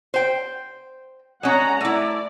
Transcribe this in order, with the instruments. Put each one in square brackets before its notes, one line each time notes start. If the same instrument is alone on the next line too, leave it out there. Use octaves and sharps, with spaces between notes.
[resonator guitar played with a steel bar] C5 G5
[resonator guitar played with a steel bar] G#3 C#4 [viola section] F#5 A#5
[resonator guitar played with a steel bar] A3 E4 [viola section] D5